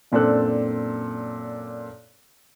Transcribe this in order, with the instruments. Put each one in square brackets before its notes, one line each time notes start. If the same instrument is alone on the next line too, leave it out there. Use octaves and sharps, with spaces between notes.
[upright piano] F#2 A#2 C4 D4 A4 F#6